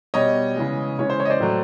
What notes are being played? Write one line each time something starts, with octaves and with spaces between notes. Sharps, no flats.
B2 G3 C#5 D#5
C#3 E3 G#3
C#3 E3 G#3 C#5
C5
C#5
D#5
C5 D5
A2 F#3 A3